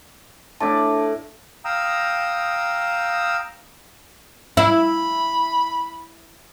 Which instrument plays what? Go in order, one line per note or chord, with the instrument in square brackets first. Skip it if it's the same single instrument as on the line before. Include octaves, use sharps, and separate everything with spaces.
[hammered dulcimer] A2 D5 [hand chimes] D4 A5
[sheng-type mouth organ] F5 G5 A#5 D#6 E6
[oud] E4 [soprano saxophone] B5